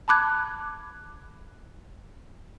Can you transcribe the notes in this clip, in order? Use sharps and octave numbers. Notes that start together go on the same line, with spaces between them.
A5 B5 D6 F#6 G#6